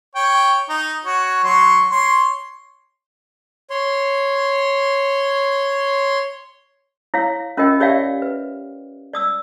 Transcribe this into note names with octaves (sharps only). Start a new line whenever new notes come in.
C#5 G5
D#4
F#4 C#5
F#3 C6 C#6
C#5 C6
C#5 C6
E4 C#5 F5
C#4 F4 A#4 D#5 G5
G4 C#5 D5 E5 F5 G5
B4
D5 D#6 E6